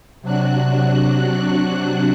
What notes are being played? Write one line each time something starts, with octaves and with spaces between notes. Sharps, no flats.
C3 F#3 D4 F#4 F#6